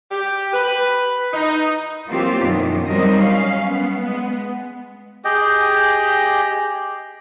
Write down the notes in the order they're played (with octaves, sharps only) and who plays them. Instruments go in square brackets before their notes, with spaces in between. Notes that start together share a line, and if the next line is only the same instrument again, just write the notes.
[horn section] G4
B4
D#4
[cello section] E3 F#3 A#3 C4 F4 G4
F#2 B2 D#3 F3
F#3 G3 C4 D#4 A#4 D#5
C#4 F5
B3
G#3 B3
[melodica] G4 G#4 D#5 G5